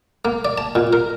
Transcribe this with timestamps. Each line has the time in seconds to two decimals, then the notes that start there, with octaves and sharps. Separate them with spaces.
0.25 A#3
0.45 D5
0.58 A5
0.75 A#2
0.93 A#4